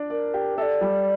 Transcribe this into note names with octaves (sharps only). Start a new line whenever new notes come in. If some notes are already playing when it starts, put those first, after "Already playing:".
Already playing: D4 D5
A#4 D5
G4
A4 D5 E5
G3